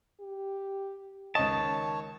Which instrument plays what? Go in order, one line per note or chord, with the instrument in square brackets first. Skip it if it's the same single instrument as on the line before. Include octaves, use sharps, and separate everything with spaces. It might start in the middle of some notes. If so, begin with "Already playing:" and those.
[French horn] G4
[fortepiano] C#2 D#5 [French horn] D#3 [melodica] C#5 [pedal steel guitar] A5